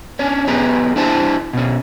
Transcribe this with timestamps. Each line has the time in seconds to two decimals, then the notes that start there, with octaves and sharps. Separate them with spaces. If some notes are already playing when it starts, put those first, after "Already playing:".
0.19 C#4 D4 C#5
0.47 B3 D#4 G4 G#4 A#5
0.96 D4 E4 G4 C5 D5 A5
1.53 B2 C#4